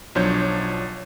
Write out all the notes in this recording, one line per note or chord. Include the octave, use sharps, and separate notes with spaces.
B1 F3 F#3 D4 C#5 G6